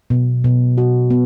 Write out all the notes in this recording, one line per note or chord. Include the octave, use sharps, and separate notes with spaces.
B2
B2
F#4
B3